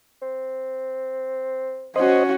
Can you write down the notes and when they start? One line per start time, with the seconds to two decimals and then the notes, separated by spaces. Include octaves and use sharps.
0.22 C4
1.96 C#4 F#4 C5 D#5